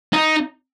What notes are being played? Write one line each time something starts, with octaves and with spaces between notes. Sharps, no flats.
D#4